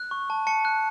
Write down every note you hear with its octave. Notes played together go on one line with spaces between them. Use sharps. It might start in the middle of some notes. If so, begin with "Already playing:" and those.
Already playing: F#6
C#6
A5
A5 C#7
F#6